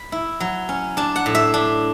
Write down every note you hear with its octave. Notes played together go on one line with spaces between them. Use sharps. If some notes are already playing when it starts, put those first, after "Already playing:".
Already playing: B5
E4
F#3
C#4
D4 A5
F#5
A2
E5
D4